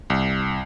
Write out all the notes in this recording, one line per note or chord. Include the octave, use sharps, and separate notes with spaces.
C2